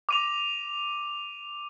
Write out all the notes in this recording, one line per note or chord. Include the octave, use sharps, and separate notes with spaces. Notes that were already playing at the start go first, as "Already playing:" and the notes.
D6 D#7 F7